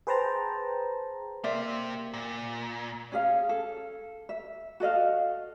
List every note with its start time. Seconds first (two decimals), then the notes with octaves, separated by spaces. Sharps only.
0.07 G#4 B4 C5 G5 A5 A#5
1.44 A#3 G4 C5 D5 E5
2.14 A#2
3.12 C#4 G#4 F5
3.49 A4
4.29 E5
4.80 F#4 A4 D#5 F5